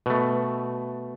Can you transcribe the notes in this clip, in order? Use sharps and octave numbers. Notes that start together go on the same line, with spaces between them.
B2 A3